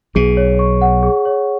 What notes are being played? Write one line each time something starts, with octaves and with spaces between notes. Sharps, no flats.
B1 B2 G#4
C#5
C#6
F#5
G#4
C#5